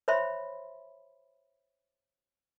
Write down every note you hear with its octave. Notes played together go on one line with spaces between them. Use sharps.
C5 C#5 E5 B5 C6